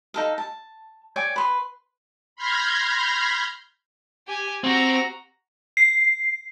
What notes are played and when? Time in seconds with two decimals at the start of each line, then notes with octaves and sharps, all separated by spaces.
0.14 D#4 A4 F5
0.38 A5
1.16 C#5 D5 G5 G#5
1.36 B4 C6
2.36 B5 C6 F6 G6 G#6 A#6
4.27 G4 G#5
4.64 C4 F#4 A#5
5.77 C7